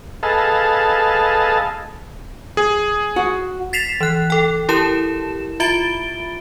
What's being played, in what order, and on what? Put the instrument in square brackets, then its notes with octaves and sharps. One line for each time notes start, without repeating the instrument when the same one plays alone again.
[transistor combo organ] G#4 A4 B4 D#5 F5 A5
[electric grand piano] G#4
[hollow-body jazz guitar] F#4
[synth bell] A6 B6 C7 E7 F7
E3 F#6
A4 G5
E4 G4 A#4 A5 E7
F4 E5 B5 A6 D7 G7